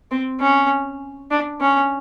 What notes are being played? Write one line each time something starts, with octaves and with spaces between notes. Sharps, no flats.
C4
C#4
D4
C#4